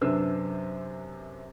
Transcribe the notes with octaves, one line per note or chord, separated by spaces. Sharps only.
F#2 C3 D4 B4 C5 E6